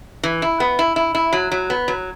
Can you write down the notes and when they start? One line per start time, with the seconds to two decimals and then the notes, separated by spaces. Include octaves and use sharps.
0.23 E3
0.42 E4
0.60 B3
0.79 E4
0.96 E4
1.15 E4
1.33 F#3
1.52 F#3
1.70 B3
1.88 F#3